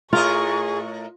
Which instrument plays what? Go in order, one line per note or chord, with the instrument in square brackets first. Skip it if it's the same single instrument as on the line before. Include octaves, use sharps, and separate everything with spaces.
[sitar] A2 A#4 D#5 [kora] F4 [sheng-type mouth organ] G#4 [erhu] C#6